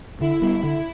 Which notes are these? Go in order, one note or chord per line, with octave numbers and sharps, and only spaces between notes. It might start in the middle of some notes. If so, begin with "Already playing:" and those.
D3 E4
G3 B3
D3